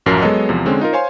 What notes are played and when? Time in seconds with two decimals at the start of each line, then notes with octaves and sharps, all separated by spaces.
0.06 A1 F#2 F3 F#3 A#4 C7
0.22 F#3 G#3 B3 A4 C#5 D#5
0.49 E2 C3 F3
0.66 D3 G#3 C4 C#4
0.81 D#4 F4 A#4
0.93 C5 C#5 F5 G#5 C6